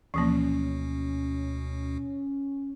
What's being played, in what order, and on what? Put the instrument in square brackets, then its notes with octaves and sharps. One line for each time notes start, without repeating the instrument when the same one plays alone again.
[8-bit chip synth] D2 B2 [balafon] E3 F3 A#3 [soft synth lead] C#4